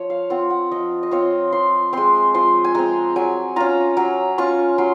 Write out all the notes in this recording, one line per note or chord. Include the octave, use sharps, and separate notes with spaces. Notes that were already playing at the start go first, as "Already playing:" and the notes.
Already playing: F3 C#5
F5
C4 F4 F#5
F#5
F3 D#5
D#5
C4 F4 C#5
F3 C6
G#3 C4 C6
F3 C6
G#5
G#3 C4 A#5
F#3 G#5
C#4 F4 A#5
F#3 A#5
C#4 F4 C#6
F#3 C6